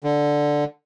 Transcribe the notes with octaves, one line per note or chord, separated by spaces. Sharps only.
D3